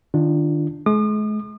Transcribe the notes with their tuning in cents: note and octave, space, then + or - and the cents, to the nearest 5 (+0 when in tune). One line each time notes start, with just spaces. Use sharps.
D#3 -25 D4 +0 F4 -20
G#3 +40 D#6 -45